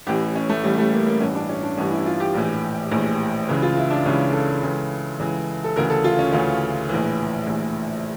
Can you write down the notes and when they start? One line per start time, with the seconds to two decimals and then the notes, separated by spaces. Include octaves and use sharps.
0.07 A1 A2 E3 G4
0.35 C#4
0.49 A3
0.64 A1 A2 E3 G3
0.78 A3
0.93 A#3
1.07 A#3
1.20 A1 G2 E3 C#4
1.35 D4
1.49 C#4
1.63 D4
1.77 A1 G2 E3 C#4
1.91 E4
2.06 F4
2.20 G4
2.34 A#1 A2 E3
2.91 A#1 A2 E3
3.49 C#2 C#3 E3
3.62 F4
3.77 E4
3.90 D4
4.05 C#2 C#3 E3 C#4
4.33 A4
4.62 C#2 C#3 E3
5.19 C#2 C#3 E3
5.64 A4
5.76 D2 C#3 E3 A#4
5.90 A4
6.04 F4
6.19 C#4
6.32 D2 C#3 E3 C#4
6.89 A#1 A2 E3
7.47 A#1 A2 E3